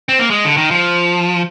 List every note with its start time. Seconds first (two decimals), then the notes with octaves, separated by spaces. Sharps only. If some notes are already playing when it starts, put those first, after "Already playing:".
0.09 C4
0.19 A#3
0.30 G#3
0.45 D3
0.57 D#3
0.71 F3